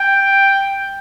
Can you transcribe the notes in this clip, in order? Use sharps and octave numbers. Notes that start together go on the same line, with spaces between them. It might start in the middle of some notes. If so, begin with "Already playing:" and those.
Already playing: G5